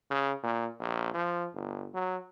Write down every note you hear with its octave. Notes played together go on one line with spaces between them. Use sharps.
C#3
A#2
A#1
F3
G1
F#3